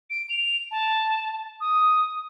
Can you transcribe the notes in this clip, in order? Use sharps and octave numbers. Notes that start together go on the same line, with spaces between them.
D7
F7
A5
D#6